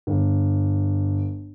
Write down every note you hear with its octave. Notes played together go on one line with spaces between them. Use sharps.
G1